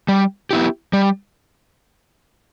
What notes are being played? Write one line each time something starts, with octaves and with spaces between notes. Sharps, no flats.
G3
B3 E4 G4
G3